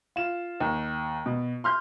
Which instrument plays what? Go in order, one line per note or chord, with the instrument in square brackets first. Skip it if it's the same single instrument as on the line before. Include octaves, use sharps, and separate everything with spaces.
[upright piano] F4 E7
D#2
B2
C6 F6 G6